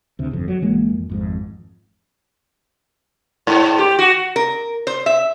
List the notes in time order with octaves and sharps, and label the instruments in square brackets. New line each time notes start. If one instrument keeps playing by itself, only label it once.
[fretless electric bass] D2 C3
G1 F2
F#3
G#1 E3 G#3 A#3
F2
G#1 F2 G#2
[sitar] G#2
G4
F#4
[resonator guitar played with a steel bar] A#4
C5
E5